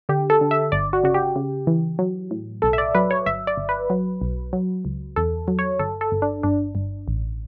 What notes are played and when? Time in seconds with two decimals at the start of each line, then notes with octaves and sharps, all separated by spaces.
0.09 D3 G4
0.30 A4
0.41 D3
0.51 E5
0.72 G1 D5
0.93 F#4
1.04 C#3 F#4
1.14 G4
1.36 C#3
1.67 E3
1.99 F#3
2.31 A2
2.62 B1 A4
2.73 E5
2.78 D5
2.95 F#3 B4
3.11 C#5
3.26 G1 E5
3.47 D5
3.57 G1
3.69 B4
3.90 F#3
4.21 B1
4.53 F#3
4.85 C#2
5.16 E2 A4
5.48 F#3
5.59 C#5
5.79 G1 A4
6.01 A4
6.12 G1
6.22 D4
6.43 G1 D4
6.75 G1
7.08 A1